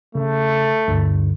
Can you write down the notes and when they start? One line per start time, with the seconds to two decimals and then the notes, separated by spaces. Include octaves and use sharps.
0.15 C#3 A3
0.88 D2 G2 D3